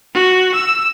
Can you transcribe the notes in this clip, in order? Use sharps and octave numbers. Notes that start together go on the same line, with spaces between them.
F#4
E6